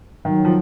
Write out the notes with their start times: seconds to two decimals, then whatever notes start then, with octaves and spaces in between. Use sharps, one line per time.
0.25 D#3 F#3
0.45 F3